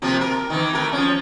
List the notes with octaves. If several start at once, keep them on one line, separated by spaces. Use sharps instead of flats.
C3 F3 A#3
A#4
D#3 E3
A3 A#4
F3 C#4